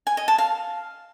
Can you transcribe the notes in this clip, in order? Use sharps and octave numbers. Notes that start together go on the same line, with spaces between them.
G#5
D#5
A5
F5